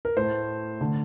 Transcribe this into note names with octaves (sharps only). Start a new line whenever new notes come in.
A#4
A2 A3 C5
D3 A3